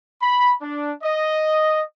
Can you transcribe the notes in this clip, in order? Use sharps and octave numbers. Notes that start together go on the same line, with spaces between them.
B5
D4
D#5